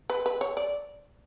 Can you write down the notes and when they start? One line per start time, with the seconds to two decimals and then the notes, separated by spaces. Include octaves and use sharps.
0.10 B4
0.26 B4
0.41 C#5
0.57 D5